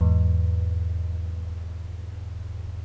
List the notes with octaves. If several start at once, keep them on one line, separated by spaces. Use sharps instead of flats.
E2 G#2